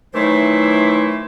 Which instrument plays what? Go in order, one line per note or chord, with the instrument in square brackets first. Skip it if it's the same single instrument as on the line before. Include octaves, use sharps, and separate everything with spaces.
[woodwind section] D#3 E3 F#3 A3 E4 C5